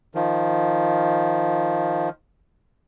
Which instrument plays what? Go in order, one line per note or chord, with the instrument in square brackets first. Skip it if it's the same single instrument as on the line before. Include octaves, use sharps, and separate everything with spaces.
[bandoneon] D#3 F3